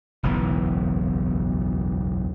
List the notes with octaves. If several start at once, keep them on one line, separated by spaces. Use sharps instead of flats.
F#1 B1 E2 E3